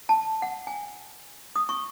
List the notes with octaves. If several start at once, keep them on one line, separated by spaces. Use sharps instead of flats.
A5
F#5
G#5
D#6
C#6